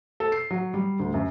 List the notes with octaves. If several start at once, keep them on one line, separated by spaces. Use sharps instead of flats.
A4
C7
F#3
G3
D2
F#2